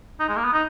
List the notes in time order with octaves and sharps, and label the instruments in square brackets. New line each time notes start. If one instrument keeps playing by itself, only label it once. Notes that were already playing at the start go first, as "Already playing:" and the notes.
[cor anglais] D#4
G#3
A#3
B3
D#4